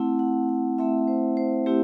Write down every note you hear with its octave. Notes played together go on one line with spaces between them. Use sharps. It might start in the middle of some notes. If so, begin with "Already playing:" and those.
Already playing: A3 C4 E4 F#5
F#5
F#5
A3 C4 E4 E5
C5
C5
A3 C4 E4 G4